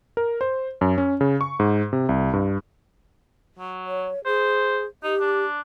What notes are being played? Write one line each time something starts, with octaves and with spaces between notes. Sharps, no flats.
A#4
C5
F#2
C#4
C#3
C#6
G#2
C3
C2
G2
F#3
C#5
G#4 C5
D#4 G4
D4